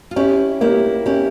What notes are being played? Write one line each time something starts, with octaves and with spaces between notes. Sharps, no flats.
F4
C#4 E4 G4
A#3 E4 G4
C#4 E4 G4